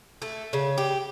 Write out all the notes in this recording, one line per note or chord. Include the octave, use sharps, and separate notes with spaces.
A3
C#3
G4